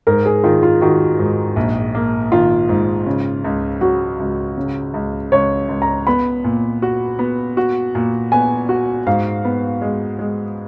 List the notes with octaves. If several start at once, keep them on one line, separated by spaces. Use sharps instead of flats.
G#2 A#4
G#4
D#3 F4
F4
D#3 F#4
G#2
A#1
A#3
D#3 F4
G#2
C#3
C#2
F#3 F#4
C#2
C#3
C#2
C#2 C#5
C#2
A#5
B3 B5
A#2
F#4
B3
F#4
A#2
B3 G#5
F#4
G#2 F5
B3
G#3
G#3